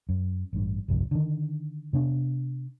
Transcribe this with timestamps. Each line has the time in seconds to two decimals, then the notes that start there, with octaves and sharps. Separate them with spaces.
0.09 F#2
0.53 A1 G2
0.88 G1 C2 F2
1.11 D3 D#3
1.93 C3 B3 D4